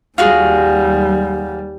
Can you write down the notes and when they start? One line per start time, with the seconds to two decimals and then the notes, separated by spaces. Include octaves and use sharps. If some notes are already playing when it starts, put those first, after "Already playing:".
0.18 D#2 G3 F4 F#4 G#4